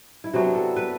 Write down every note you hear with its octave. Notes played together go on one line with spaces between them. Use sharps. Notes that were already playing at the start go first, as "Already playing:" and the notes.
E4
C3 F#3 B3 D4 F#4
A4
B4